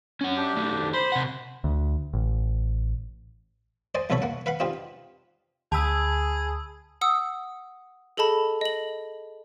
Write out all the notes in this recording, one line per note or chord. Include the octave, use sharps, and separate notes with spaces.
C#4 F#5
D4 G4
D#3 A3
C5 B5 C6
C3 F#5
D2
A1
C5 D5 D#5 G#5
C2 B2 D3 A4 C#5 B5
A#3 F#5
B4 F5 F#5 B5
C4 D4 D#4 F4 G4
D2 G#4 A5 B5 D#6 E6
F#5 D#6 E6
G#4 A4 D#5 A5 B5
D#5 F#7